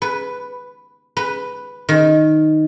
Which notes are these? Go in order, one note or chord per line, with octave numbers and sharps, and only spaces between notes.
B4
B4
D#3